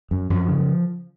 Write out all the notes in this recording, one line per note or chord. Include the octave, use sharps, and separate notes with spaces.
F#2
F#2 F3
C#3